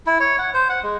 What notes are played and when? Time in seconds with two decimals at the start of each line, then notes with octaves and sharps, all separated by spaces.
0.06 E4
0.20 C#5
0.39 F#5
0.54 C5
0.69 F#5
0.83 G#3